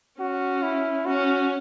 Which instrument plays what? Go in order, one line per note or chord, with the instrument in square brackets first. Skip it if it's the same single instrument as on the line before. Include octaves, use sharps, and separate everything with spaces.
[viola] C#4 [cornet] F#4
[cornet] E4
[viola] C#4 [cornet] F#4